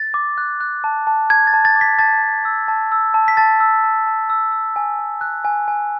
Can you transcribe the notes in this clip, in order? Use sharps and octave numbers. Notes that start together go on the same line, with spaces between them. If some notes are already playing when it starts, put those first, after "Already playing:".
Already playing: A6
D6
F#6
F#6
A5
A5
A5 G#6
A6
A5
A6
D6
B6
A5 A6
A5
E6
A5
E6
A5
B6
A5 A6
E6
A5
A5
E6
E6
G#5
G#5
F#6
G#5
G#5